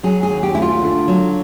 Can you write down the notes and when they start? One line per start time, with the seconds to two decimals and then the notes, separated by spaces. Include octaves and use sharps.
0.03 F#3 G#4
0.23 G#4
0.30 D#2
0.43 G4
0.55 A3 E4
0.62 F4
0.82 D3
1.08 F#3